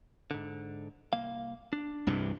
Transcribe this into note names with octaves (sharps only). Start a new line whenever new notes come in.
G#2 D3
C2 A#3 F5
D4
C2 G2 E3